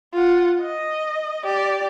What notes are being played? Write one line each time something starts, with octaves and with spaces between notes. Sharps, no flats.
F4 F#5
D#5
G4 D5